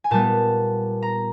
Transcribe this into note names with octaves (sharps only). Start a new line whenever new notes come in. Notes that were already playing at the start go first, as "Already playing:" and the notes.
G#5
A#2 G3 B3 A5
A#5